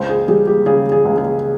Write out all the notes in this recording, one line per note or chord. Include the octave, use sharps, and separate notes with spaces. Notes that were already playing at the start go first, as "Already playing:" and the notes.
Already playing: C#2 C5
G#4
G3 G#4
G4
C#3 G#4
G#4
C#2
G#4